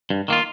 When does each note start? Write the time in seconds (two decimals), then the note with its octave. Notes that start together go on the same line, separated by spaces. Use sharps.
0.10 G2
0.28 D#3 A#3 F4